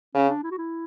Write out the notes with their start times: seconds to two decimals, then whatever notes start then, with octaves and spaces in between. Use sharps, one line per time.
0.15 C#3 C#4
0.29 D4
0.43 E4
0.51 F#4
0.58 E4